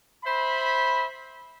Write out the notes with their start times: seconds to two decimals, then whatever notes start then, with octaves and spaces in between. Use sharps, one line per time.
0.25 C5 E5 B5